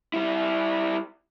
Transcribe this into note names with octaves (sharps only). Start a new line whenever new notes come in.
G3 E4